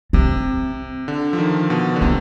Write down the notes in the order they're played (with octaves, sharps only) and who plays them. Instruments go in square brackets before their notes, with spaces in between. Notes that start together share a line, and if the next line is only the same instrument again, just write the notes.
[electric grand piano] C3 [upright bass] C4
[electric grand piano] D3
F3
D#3
B2
D3
[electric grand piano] C3 [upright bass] B3